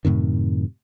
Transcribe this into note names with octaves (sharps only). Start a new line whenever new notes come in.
F#2 A2 C3 D#3